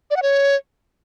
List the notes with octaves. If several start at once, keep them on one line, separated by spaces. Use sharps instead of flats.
D5
F#5
C#5